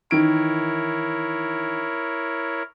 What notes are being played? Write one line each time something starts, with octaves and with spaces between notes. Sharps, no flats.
D#3 E3 E4 A#4 C#5 D7